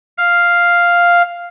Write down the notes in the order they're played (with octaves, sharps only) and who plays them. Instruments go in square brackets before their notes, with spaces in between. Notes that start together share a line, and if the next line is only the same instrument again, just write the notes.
[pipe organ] F5